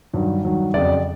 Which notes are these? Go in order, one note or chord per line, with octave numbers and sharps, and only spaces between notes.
G2 D#3 F#3
G2 D#3 F#3
F2 C#3 F#3 D5